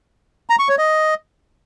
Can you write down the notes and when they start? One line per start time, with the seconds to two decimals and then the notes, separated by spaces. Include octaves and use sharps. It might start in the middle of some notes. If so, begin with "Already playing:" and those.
0.50 A#5
0.59 C#6
0.69 C#5
0.78 D#5